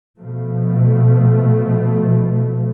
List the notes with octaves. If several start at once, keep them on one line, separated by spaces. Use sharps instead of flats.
B2 F3 A3